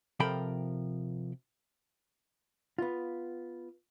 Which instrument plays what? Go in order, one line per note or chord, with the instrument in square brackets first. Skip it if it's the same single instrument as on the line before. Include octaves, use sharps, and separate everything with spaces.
[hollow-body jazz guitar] C3 F3 A4 A#4 G5 B5
B3 F4